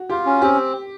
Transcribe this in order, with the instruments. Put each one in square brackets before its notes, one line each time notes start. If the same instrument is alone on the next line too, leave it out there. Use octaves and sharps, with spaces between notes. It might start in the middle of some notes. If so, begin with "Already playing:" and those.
Already playing: [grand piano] F#4
[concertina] F4 [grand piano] G4
[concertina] C#4
[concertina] C4 [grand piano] G4